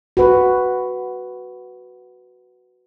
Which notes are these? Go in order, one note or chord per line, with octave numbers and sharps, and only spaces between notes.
F#4 B4